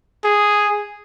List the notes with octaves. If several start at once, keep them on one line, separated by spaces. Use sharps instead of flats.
G#4